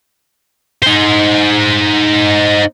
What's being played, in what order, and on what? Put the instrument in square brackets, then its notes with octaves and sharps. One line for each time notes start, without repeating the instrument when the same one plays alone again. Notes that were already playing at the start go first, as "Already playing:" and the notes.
[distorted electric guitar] D#4 C5